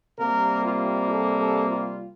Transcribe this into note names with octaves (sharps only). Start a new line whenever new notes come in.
C3 G3 A#3 A#4
F4
A4
A4
F4